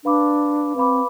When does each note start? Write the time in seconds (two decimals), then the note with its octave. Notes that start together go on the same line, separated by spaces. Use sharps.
0.04 D4 B4 F5 B5 D6
0.76 C4 B4 F5 B5 D6